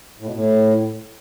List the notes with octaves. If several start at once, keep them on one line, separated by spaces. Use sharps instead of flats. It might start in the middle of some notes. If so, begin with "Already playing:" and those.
A2
B2
A2